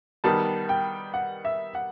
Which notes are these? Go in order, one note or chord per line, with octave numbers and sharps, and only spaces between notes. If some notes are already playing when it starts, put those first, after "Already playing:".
D#3 G3 B3 A5
G5
F#5
E5
F#5